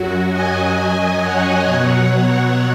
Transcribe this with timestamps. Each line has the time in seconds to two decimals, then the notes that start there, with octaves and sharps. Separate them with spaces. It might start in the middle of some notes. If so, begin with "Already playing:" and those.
Already playing: F#2 F#3 F#4
0.32 D#5 G#5
0.76 F#2 F#3
1.21 C#5 F#5
1.65 B2 F#3